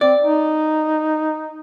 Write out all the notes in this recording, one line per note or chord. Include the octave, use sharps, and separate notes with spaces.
C4 D5
D#4